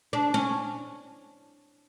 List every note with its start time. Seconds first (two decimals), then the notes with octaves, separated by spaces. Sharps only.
0.13 D4
0.34 C#4